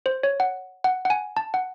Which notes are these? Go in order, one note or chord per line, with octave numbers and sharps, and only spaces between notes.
C5
C#5
F#5
F#5
F#5
G#5
A5
F#5